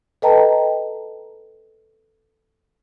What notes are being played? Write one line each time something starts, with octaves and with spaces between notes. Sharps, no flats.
A4 B4 D#5 G5 A5 A#5